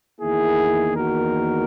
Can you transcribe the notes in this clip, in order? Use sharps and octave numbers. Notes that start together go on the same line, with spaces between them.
E2 D#3 A#3 E4 G#4
F#4 A#4